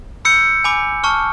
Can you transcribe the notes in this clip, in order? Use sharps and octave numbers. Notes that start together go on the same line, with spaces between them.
B5 E6 G6 C#7
G#5 B5 D6
A5 C#6 F6